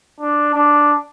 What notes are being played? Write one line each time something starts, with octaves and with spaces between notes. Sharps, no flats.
D4
D4